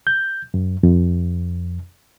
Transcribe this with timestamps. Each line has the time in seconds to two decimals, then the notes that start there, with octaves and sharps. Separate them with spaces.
0.07 G6
0.54 F#2
0.83 F2